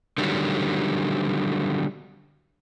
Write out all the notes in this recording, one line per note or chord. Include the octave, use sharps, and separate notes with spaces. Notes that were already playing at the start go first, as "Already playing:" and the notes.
D3 D#3 F#3 G3